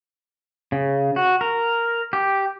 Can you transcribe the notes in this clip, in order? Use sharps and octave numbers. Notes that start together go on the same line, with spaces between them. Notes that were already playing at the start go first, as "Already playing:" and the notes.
C#3
F#4
A#4
G4